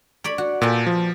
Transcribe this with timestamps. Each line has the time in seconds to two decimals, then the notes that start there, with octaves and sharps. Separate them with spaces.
0.24 C#5 D5 B5
0.38 F#4
0.62 A#2 B4 G5 A5
0.87 F3